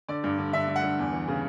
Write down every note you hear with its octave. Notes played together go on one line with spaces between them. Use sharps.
D3 D5
G2
D3
D3 E5
D3
F#5
G2
E2
E3
C#3